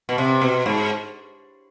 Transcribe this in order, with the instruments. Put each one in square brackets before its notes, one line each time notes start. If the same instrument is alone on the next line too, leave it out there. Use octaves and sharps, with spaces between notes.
[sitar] B2
C3
B2
G#2